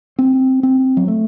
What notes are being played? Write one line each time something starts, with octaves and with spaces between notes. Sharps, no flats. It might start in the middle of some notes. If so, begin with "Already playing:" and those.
C4
C4
F#3
A3